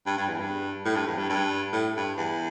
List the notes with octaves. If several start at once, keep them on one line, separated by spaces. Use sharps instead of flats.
G2
G2
E2
G2
A2
G2
E2
G2
G2
A2
G2
E2